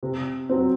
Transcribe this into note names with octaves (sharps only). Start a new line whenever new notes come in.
C3
F#3 C4